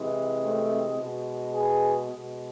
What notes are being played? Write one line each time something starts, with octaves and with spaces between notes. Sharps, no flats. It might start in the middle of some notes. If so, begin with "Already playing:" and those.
Already playing: C3 E3 G#3
A3 C4
B2 G#3
G#4 B4
B2 G#3